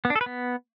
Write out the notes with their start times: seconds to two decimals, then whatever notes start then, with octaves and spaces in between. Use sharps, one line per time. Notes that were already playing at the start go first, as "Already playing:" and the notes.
0.05 B3
0.10 D4
0.16 A4
0.21 B4
0.26 B3